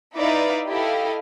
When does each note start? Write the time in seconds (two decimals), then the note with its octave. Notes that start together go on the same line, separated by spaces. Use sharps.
0.16 D#4 E4 B4 D5 E5 F5
0.68 E4 G4 A4 D#5 F5